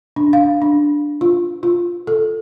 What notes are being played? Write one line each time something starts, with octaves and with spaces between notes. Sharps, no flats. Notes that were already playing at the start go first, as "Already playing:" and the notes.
D4
F5
D4
F4
F4
A4